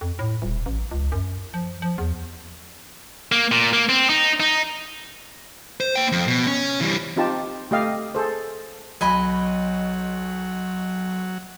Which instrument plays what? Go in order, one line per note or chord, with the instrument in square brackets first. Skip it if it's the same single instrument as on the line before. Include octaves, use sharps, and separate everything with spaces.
[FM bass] F2
A2
D#1
A1
C#2
F#2
F3
F3
E2
[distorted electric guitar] A#3
A#2
A#3
C4
D#4
D#4
[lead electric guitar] C5
A#3 G5
F2
B2
C#4
E3 G3
[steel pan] C4 D#4 F4 G4 A5
A3 G4 D#5 F5
G#4 A4 C5
[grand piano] B1 [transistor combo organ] F#3 [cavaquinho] D#5 G#5 B5